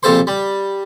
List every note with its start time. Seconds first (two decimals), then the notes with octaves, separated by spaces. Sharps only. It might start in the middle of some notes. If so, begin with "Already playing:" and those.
0.03 A#1 C3 A4 C5 C6
0.27 G3